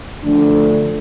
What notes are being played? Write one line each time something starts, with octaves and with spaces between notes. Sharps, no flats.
D3 F3 A3 D4